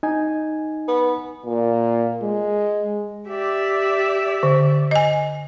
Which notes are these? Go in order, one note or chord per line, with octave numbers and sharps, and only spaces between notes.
D#4 G#5
B3
A#2
G#3
G4 D5 E5
D3
D#5 G#5